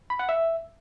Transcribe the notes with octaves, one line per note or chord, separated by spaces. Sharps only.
B5
F#5
E5